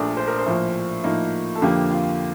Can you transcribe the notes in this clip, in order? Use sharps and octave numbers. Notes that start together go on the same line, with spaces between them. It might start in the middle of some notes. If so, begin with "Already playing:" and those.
Already playing: A#1 A#2 A3 D4
C5
A#4
C5
A2 F3 A#3
A2 F3 A#3 D#4
A4
F2 D3 F3 A#3 G4
F4